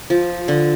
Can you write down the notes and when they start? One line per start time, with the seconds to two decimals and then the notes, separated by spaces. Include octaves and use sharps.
0.10 F3
0.48 D3